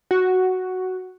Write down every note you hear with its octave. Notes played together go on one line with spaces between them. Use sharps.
F#4